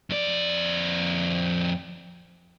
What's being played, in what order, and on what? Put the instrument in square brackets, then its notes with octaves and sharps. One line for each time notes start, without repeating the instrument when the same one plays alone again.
[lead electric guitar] F2 D5